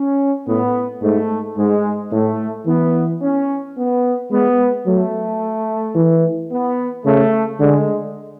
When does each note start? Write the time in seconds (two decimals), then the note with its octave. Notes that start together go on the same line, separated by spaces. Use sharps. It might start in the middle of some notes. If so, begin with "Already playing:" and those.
Already playing: C#4
0.48 A2 B3
1.02 G#2 A3
1.57 G#2 G#3
2.12 A2 A3
2.66 E3 B3
3.21 C#4
3.76 B3
4.31 G#3 B3
4.86 F#3 A3
5.95 E3
6.51 B3
7.05 C#3 A3
7.60 D3 G#3